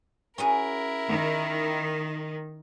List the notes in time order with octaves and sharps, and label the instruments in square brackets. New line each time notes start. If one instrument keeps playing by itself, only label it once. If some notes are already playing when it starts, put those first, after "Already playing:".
[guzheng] C#4 F#4 G#4 [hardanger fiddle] E4 A#4
[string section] D#3